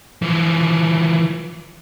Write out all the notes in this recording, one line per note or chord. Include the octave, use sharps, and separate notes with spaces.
E3 F3